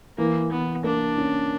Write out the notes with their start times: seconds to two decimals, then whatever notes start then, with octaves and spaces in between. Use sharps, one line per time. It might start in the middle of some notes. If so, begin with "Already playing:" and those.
0.18 E3 A#3
0.51 E3 B3
0.84 A#3 D4
1.18 C#4